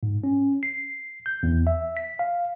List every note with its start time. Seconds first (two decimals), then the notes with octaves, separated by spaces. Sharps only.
0.03 G#2
0.24 C#4
0.63 C7
1.26 G6
1.43 E2
1.67 E5
1.97 B6
2.19 F5